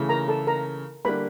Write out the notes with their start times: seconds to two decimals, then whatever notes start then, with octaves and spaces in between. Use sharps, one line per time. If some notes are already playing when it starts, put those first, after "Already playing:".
Already playing: C#3 E3 A3
0.09 A#4 A#5
0.28 A4 A5
0.47 A#4 A#5
1.05 D3 G3 A#3 B4 B5